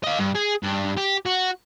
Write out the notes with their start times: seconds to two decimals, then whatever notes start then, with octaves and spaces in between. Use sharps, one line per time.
0.04 D#5 F5
0.19 G2
0.35 G#4
0.63 G2
0.97 G4
1.26 F#4